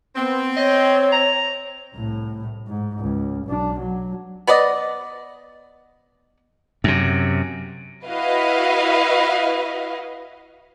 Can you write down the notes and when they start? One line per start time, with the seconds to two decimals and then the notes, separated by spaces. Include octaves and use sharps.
0.16 B3 C4
0.56 C#5 D#5
1.12 A#5
1.95 C2 A2
2.67 G#2
3.00 C#2
3.46 B1 D4
3.79 F#3
4.47 B3 B4 D5 D#5
6.84 F#2 C3
8.05 E4 F#4 B4 D#5 F5